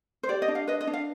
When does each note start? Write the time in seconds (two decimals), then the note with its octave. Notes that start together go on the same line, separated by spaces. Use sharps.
0.23 C5
0.29 G4 D5
0.42 D#5
0.48 D4
0.55 F5
0.68 B4 D#5
0.81 D#5
0.87 D4
0.93 F5